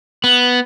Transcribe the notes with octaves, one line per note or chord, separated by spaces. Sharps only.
B3